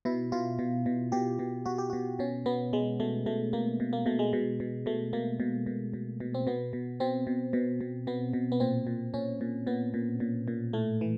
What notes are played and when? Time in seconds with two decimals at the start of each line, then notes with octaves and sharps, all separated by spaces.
0.05 B2 E4
0.32 B2 F4
0.59 B2
0.86 B2
1.12 B2 G4
1.39 B2
1.66 B2 F#4
1.78 G4
1.90 B2 F#4
2.19 B2 C#4
2.46 B2 B3
2.73 B2 G#3
3.00 B2 A3
3.26 B2 A3
3.53 B2 A#3
3.80 B2
3.93 A#3
4.06 B2 A3
4.19 G#3
4.33 B2
4.60 B2
4.86 B2 A3
5.13 B2 A#3
5.40 B2
5.66 B2
5.93 B2
6.20 B2
6.34 C4
6.47 B2 B3
6.73 B2
7.00 B2 C4
7.27 B2
7.53 B2
7.81 B2
8.07 B2 B3
8.33 B2
8.52 B3
8.60 A#2 C4
8.87 A#2
9.14 A#2 C#4
9.41 A#2
9.67 A#2 B3
9.94 A#2
10.20 A#2
10.48 A#2
10.73 A2 A3
11.01 E3